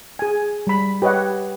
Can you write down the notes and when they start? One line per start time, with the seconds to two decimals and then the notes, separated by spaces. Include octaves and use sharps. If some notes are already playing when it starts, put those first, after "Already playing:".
0.19 G#4 G#5
0.67 G3 B5
1.02 G4 B4 C#5 D#5 F#5